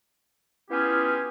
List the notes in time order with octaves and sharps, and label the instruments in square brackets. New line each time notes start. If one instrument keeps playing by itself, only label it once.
[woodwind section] B3 C#4 E4 F4 G4 G#4